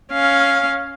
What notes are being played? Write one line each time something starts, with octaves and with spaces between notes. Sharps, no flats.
C#4 F5